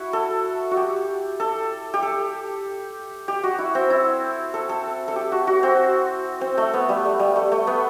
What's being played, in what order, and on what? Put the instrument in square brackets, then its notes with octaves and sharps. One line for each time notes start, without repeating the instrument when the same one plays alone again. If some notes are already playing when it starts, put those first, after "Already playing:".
Already playing: [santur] E4 F#4
A4
F#4
G4
A4
G4
A4
G4
F#4
E4
C4
E4
A4
A4
A4
G4
F#4
F#4
C4
C4
A3
B3
G3
A3
G3
A3
A3
B3